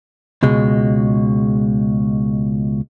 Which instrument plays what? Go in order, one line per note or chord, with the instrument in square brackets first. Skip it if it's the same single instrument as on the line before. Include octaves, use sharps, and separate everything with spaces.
[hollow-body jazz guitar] C#2 B2 G#3